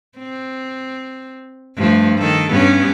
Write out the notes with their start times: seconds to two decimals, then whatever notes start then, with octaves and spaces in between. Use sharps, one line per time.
0.18 C4
1.77 G2 F3 A3
2.18 D#3 A4
2.50 G2 B3 C#4